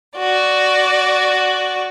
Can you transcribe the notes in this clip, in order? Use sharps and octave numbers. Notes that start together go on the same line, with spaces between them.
F#4 D5